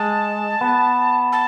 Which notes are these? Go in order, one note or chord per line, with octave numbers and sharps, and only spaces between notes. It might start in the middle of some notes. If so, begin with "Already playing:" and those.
Already playing: G#3 A5
B3
A5